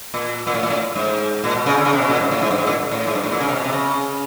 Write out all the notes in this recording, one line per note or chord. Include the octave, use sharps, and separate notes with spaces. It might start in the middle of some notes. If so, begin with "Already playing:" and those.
A#2
A#2
A2
A#2
A2
G#2
A#2
B2
C#3
D3
C#3
C3
B2
A#2
G#2
A2
G#2
G2
G#2
A#2
A2
G#2
G2
A2
A#2
C#3
C3
B2
C3
C#3